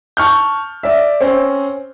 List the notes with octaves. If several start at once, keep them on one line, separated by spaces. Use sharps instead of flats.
A5 C#6 F6 G6
D5 E5
C4 C#4 C5